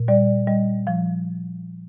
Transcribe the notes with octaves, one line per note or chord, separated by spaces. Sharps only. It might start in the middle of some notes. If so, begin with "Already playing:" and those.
Already playing: A#2
G3 D5
G3 D#5
F3 F5